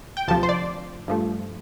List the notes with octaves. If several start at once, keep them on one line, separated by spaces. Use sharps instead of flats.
G5
D2 C3 F3 A5
C5
D5
G2 F3 A3